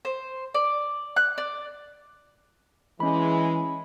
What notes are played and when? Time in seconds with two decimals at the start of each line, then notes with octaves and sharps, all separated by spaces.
0.05 C5
0.54 D5
1.16 F#6
1.38 D5
3.00 E3 G#3 C#4 B5